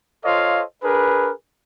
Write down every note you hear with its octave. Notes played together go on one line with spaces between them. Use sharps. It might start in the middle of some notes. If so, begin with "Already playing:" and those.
F4 A4 C5 C#5 D#5 F5
D4 G#4 A#4 B4